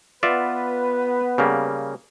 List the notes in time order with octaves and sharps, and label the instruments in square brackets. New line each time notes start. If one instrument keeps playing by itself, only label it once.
[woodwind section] B3 B4 [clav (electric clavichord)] F4 D5 E5
[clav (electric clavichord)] C#3 G3 A#3